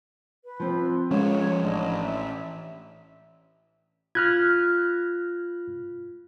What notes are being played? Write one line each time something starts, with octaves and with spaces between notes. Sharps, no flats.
B4
F3 C4
F3 G#3 C#4 C#5
A1 D4 D#5
E5
F4 F6 F#6 G#6 A#6